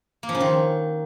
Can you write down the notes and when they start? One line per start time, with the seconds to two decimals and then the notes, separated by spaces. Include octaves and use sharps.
0.23 A#3
0.29 F3
0.35 C#3
0.40 D#3